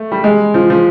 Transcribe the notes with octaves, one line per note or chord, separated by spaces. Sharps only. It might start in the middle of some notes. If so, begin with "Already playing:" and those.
Already playing: A3
G3
G#3
F3
F3